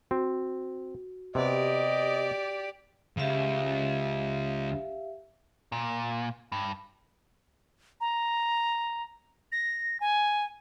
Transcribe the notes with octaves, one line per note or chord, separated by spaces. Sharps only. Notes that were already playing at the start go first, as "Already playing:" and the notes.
C4 F#4
C3 B3 G4 D5 D#5
C#2 G4 E5 F5
A#2
G2
A#5
A#6
G#5